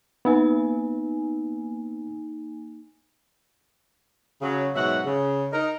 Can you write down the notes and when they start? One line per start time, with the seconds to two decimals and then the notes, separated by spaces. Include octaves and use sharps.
0.25 A#3 B3 D#4 G#5
4.41 C#3 F#3
4.75 G#2 B2 F#3 F#4 E5 F#5
5.04 C#3
5.53 D#4 A#4